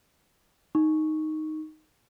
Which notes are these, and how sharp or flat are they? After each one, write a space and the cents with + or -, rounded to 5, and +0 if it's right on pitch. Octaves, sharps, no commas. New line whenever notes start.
D#4 +0 C#6 +0